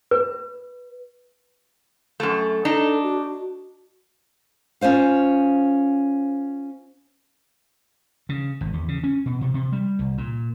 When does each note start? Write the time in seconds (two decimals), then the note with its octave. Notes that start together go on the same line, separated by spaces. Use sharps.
0.11 B4
2.20 F#2 A3
2.65 D4 D#4 A4
3.03 F#4
4.81 C#4 F4 C5 F5
8.29 C#3
8.61 G#1
8.73 E2
8.88 C#3
9.04 C#4
9.26 B2
9.41 C3
9.54 C3
9.72 G3
9.99 C2
10.18 A#2